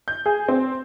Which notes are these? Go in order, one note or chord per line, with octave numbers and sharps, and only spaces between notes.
G6
G#4
C4